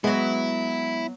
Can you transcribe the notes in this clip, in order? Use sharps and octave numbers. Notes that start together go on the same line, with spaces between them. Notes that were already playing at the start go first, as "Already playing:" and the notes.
F#3 G#3 B3 E4